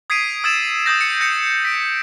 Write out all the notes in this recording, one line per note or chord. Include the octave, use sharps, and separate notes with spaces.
D#6 G#6 B6 C7 D7 D#7
D#6 E6 G#6 A6 E7
D#6 E6 G6 A#6
C#7
G6 A#6 C#7
B6 D7